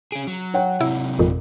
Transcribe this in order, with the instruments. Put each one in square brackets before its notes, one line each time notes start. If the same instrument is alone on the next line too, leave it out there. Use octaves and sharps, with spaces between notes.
[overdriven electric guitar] C#4 G#4 [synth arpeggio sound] D7
[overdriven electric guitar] F#3
[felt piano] C#5 F#5 G5
[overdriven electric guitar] C3 F#3 [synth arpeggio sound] E4
[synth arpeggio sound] G#1 F2 A#2